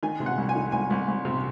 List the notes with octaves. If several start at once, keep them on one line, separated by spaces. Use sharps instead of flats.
D#3 G#5
C3
F#5
C2
G#5
D#3
C2 G#5
C2
C2
C3